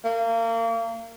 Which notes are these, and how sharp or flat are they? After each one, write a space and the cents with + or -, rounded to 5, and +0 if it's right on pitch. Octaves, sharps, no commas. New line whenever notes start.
A#3 -30